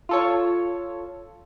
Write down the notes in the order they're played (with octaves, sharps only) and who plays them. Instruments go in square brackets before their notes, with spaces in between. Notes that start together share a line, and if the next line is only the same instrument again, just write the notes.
[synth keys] F4 A4 C#5